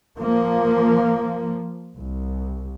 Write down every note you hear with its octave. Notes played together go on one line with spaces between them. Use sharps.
F3 A#3
C2